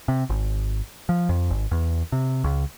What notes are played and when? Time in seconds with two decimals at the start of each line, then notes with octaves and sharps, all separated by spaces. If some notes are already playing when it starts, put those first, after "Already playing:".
0.08 C3
0.30 G#1
1.09 F3
1.29 F2
1.50 G#1
1.71 E2
2.12 C3
2.44 C#2